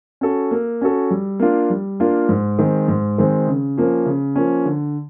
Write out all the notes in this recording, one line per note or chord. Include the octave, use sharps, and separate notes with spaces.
C#4 F#4 A4
A#3
C#4 F#4 A4
G3
A#3 D4 F4
G3
A#3 D4 F4
G#2
D#3 G#3 C4
G#2
D#3 G#3 C4
C#3
F3 A#3 C#4
C#3
F3 A#3 C#4
D3